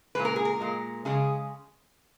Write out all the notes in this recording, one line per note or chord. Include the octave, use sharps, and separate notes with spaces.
A#2 G#3 B4
A#4
G#4
A#4
A#2 G#3
C#3 G#3 G#4